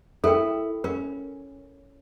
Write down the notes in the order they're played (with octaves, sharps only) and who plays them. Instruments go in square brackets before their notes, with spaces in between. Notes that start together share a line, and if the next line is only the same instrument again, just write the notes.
[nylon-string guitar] E4 [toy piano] A4 A#4 G5
[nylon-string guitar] C#4 [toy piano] A#4